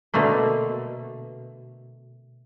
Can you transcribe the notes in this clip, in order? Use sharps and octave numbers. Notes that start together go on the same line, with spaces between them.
B2 D3 A3 A#3